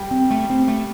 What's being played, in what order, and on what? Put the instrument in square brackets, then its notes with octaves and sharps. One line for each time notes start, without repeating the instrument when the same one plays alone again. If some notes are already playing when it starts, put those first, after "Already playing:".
Already playing: [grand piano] G3 G4
[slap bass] C4
A3
C4
A3